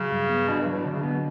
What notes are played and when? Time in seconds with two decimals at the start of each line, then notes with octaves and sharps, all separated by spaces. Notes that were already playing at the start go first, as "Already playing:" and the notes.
Already playing: C#3 F#3
0.11 G2
0.29 B3
0.48 B2 D4
0.60 G2
0.66 F#3
0.73 A2
0.85 B2 D3
0.93 C#3
1.01 B2 B3